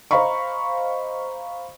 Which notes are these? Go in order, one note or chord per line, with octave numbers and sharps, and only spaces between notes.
C5 D#5 F5 A#5 B5 C#6